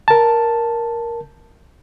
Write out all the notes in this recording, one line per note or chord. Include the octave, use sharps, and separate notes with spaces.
A#4 A5